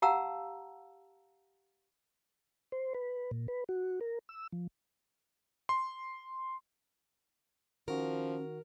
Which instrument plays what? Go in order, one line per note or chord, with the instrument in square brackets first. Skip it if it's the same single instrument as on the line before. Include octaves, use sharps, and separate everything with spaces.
[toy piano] G4 F5 F#5 A5 A#5 E6
[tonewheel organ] C5
B4
A#2
B4
F#4
A#4
E6
F3
[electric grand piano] C6
[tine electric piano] D#3 F#4 [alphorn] F3 [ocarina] C#4 [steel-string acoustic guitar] A#4